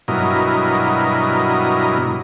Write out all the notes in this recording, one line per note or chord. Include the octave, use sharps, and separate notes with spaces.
G2 B2 F#3 E4 A#4 D#5